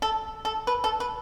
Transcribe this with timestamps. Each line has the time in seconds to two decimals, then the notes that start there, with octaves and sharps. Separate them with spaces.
0.02 A4
0.45 A4
0.67 B4
0.84 A4
1.00 B4